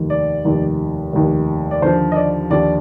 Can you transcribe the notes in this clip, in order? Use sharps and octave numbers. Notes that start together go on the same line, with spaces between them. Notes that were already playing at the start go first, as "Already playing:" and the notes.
Already playing: F1 D#2 D#3
D5
F1 D#2 D#3
F1 D#2 D#3
D5
D#2 D3 F3 C5
D#5
D5
D#2 D3 F3 D5